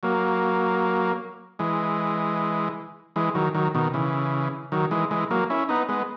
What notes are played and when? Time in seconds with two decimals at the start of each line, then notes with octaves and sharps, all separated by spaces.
0.03 F#3 A#3
1.59 E3 G#3
3.16 E3 G#3
3.35 D#3 F#3
3.55 D#3 F#3
3.75 B2 D#3
3.94 C#3 E3
4.72 D#3 F#3
4.91 E3 G#3
5.11 E3 G#3
5.31 F#3 A#3
5.50 C#4 E4
5.69 B3 D#4
5.89 G#3 B3